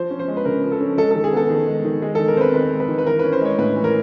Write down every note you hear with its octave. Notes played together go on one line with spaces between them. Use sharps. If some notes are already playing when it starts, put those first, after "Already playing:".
Already playing: F3 C5
C#4
C5
G#3
B4
C#3 A#4
F3
A4
C#4
G#3 A4
D#3 A4
G#4
B3 A4
D#3
G#3
D#3
G#3 G#4
D#3 A4
A#4
C4 B4 C5
D#3 B4
G#3
B4
D#3
B4
E3 A#4
C#4 B4
C5
G#3 C#5
A2 B4
E3
A#4